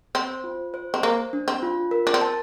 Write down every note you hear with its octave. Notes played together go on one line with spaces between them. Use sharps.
C4 C5
F4
C5
C4
A#3 C5
D4
C4
F4
A#4
D4
C4
A5